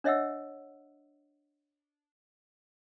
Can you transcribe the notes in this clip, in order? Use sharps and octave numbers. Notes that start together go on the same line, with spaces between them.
D4 C#5 D#5 E5 F#5 E6